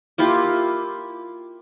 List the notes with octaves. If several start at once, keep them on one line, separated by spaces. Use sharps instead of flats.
A#3 E4 F4 G4